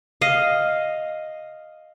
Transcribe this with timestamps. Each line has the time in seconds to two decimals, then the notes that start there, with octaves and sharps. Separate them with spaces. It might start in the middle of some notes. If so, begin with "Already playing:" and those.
0.21 D#5 F5